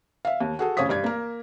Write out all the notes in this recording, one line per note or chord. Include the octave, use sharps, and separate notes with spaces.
E5 F5
D#2
F#4 G#4 A4
A1 C#3 C#5 F5 D#6 B6
G2 D5 G#6
A#3 A#4